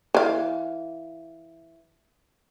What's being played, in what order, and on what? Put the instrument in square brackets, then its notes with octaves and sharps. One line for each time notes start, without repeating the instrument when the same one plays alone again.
[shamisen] E3 F5